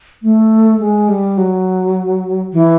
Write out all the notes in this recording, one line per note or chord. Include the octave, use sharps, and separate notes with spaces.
A3
G#3
G3
F#3
E3